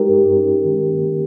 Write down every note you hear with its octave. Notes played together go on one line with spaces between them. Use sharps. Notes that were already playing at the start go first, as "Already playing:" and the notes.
Already playing: G#3 D#4 G4 A#4
G2
C#4
D#3
A#3